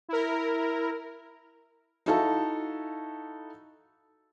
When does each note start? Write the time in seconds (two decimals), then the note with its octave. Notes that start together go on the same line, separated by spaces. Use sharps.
0.08 E4 A#4
2.06 D#4 E4 F#4 A4 F5 A5